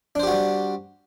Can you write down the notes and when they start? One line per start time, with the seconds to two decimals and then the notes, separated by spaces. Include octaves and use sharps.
0.15 D4
0.19 C5
0.23 G4
0.27 F#4
0.31 G3